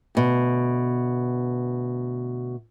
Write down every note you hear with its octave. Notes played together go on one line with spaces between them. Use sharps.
D2 B2